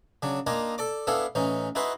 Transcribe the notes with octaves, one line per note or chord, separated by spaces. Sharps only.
C#3 F#3 D4
A#3 D4 D#4 F4 D#5 G#5
A4 D5 D6
B3 D4 E4 G#4 A4 F5
A1 E3 C#4 D#4
D#4 E4 F#4 G#4 B4 C6